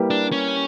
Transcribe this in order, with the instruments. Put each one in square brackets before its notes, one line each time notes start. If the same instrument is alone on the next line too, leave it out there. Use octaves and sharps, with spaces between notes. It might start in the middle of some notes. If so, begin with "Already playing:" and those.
Already playing: [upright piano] G3 A#3 E4 G4 B4
[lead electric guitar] D4
C#4